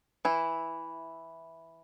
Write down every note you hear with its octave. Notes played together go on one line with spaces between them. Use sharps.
E3 E4